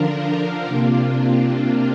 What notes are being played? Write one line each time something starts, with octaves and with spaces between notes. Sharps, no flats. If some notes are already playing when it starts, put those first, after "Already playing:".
Already playing: D3 F3 D4 F4 A#4
C3 A#3 D4 F4